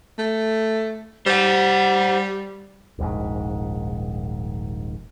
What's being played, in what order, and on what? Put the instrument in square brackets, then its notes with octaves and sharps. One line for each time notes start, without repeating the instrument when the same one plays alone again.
[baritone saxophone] A3
[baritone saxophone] G3 [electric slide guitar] C5 F#5
[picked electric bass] D#1 A#1 G#2